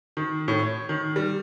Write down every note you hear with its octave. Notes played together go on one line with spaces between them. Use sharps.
D#3
A2
C#5
D#3
G3